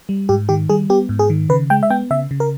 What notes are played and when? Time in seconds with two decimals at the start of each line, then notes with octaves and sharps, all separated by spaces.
0.09 G3
0.29 G#2 G4
0.49 D#3 G4
0.69 G3 G#4
0.90 B3 G4
1.09 G#2
1.19 G#4
1.30 D#3
1.49 C#3 B4
1.70 G#3 G5
1.83 E5
1.90 B3 G5
2.11 C#3 E5
2.31 C#3
2.40 A#4